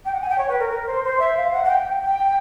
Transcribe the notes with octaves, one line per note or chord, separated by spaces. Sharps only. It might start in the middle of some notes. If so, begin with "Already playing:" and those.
G5
F#5
G#5
G5
C#5
B4
A#4
A#4
C5
C5
E5
F5
F#5
F#5
G5
G5